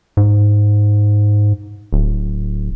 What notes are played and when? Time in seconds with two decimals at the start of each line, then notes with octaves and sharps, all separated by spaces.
0.17 G#2
1.93 D1